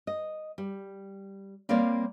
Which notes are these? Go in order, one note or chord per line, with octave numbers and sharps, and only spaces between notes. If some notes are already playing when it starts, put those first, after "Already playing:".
D#5
G3
G3 A#3 C4 A#4 C#5 D5